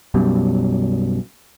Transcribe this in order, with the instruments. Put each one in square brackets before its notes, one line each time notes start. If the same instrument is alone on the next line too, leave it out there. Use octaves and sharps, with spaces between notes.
[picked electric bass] B1 F#2 B2 G3